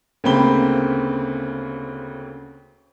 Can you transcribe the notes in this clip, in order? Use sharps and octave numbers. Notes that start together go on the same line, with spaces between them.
D2 C#3 A#3 C4 B5 G7